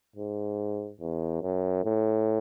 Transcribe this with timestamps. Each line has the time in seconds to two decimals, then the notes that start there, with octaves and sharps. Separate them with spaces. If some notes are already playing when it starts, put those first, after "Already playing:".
0.16 G#2
1.01 E2
1.42 F#2
1.84 A2